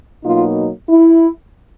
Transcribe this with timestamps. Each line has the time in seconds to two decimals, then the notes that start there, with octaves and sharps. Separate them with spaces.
0.24 B2 F#3 A#3 D#4 F4
0.89 E4